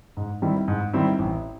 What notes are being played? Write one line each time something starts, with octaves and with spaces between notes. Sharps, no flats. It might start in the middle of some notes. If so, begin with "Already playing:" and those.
G#2
D#3 G3 C4 E4
G#2
D#3 G3 C4 E4
A1